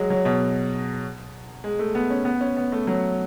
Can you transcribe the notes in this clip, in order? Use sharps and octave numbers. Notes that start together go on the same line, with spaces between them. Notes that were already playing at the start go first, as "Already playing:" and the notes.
Already playing: F#3 G#3
F#3
B2
G#3
A3
B3
C#4
B3
C#4
B3
A3
F#3